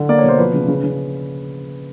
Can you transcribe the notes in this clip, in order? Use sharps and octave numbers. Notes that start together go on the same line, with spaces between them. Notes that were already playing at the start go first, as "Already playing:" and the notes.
Already playing: D3
A#3 D5
C#5
B2 C5
F3 B4
C#3
C#3
C#3